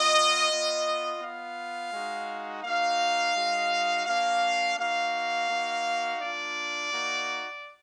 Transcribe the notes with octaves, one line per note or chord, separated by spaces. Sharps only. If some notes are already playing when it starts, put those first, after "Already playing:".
Already playing: B3 F4 D#5
B3 F4
B3 F4 F5
G#3 D#4 F#4
A#3 D#4 F#4 F5
G#3 D#4 F#4
A#3 D4 F#4 F5
A#3 D#4 F#4 F5
A#3 D#4 F#4
A#3 D4 F4 D5
A#3 D#4 F#4